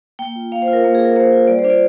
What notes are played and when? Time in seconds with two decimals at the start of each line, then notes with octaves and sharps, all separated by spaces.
0.19 A#3 G5
0.36 F4
0.52 A#3 F5
0.62 C5
0.68 F4
0.73 A#4
0.84 A#3
0.95 G#4
1.00 F4
1.05 A#4
1.16 A#3 C5
1.32 F4
1.47 G3 D5
1.59 C5
1.65 D4 F4
1.70 D5